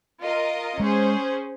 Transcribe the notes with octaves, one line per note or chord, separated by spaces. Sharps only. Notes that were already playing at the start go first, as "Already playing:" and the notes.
F4 A#4 D#5
G#3 C#4 G#4 C5